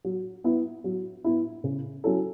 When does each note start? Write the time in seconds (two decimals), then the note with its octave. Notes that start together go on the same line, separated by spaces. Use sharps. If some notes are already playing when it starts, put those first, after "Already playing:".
0.04 F#3
0.44 B3 E4
0.84 F#3
1.24 B3 E4
1.64 C#3
2.04 F#3 C#4 E4 A4